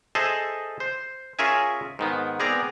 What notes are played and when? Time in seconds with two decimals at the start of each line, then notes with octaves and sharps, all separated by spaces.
0.15 G#4 A4 C5 D#5 E5 A5
0.80 C5
1.39 C#4 F4 G#4 A#4 E5 G#5
1.99 G#2 D#3 B3
2.40 B3 C4 G#4 A#4 D5 A#5